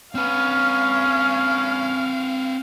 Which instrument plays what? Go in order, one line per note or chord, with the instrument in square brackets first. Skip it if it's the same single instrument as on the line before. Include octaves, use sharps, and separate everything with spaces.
[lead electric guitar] C4 B4 [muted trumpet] C#4 [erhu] F5 [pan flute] F6